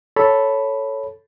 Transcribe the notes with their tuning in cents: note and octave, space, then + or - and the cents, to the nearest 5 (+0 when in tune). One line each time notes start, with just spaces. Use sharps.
A4 +0 C#5 +0 B5 +0